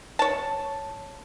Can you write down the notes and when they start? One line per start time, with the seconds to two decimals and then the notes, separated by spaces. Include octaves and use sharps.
0.19 C#5 A5